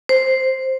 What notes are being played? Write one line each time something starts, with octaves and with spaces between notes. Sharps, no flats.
C5